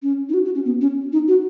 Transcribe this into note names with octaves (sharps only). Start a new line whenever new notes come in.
C#4
D#4
F#4
F#4
C#4
B3
C#4
D#4
F#4